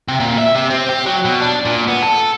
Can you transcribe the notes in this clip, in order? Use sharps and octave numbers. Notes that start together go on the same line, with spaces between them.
C3
A#2
E5
C3
C4
G4
F#3
B2
D4
A#2
B3
A4